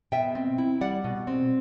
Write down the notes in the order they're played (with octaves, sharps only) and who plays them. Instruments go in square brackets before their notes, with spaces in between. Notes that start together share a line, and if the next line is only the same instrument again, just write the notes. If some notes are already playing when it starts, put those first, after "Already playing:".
[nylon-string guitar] B2 E5 G5
C4
E4
G3 D5 F#5
B2
C4